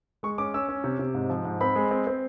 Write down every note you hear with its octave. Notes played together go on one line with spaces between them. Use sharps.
G#3 C#6
C#4 D6
C#4 E6
C#4
C3
C3
G#2
F3
G#2
C4 B5
G#3
C4
C4